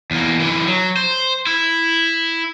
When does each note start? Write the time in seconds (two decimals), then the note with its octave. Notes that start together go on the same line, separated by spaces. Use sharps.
0.11 E2 A#3
0.40 D3 E3
0.67 F#3
0.97 C5
1.47 E4